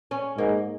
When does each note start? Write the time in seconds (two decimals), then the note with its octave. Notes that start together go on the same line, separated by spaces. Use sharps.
0.11 C#4
0.38 G#2 A#3